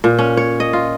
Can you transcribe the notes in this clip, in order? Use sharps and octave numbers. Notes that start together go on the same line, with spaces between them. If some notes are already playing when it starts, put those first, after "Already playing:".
A#2
C#4
C#5
D#5
F4